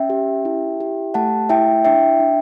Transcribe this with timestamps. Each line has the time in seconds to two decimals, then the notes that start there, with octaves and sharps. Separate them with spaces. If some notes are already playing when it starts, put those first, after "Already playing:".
Already playing: C#4 E5 G5
0.10 G4
0.45 E4
0.80 G4
1.14 A3 F#5 A5
1.49 E4 E5 G5
1.85 D4 E5 G5
2.20 D4